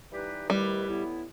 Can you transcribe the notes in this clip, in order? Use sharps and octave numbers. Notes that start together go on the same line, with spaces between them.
E3 G3 D#4 G4 B4
D#2 D#3 G3 A3 E4 B4
A2 E3 B3 E4